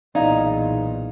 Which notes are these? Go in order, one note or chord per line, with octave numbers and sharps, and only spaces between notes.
B1 E2 A#2 D#4 D5 D#5 F5